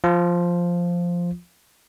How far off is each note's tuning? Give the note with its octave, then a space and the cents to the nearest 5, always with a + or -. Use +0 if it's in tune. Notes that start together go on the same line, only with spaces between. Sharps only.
F3 +0 F4 +0